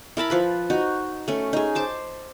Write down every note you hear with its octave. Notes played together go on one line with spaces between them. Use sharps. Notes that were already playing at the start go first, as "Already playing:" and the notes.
E4 A#4 A5 B5
F3 B4 B5
D#4 F#4
A3 C#4
D#4 G#4
C5 A5 D6